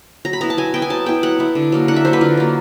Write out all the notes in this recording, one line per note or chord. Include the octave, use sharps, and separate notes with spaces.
F#3 A#5
B5
B3 E4 A#5
A5
F#3 G#5
B3 E4 G5
G#5
F#3 A5
B3 E4 G5
F#3 F#5
B3 E4
D3
F#3 A#3
D3 F#5
E5
F#3 A#3 C5
B4
D3 F4
F#3 A#3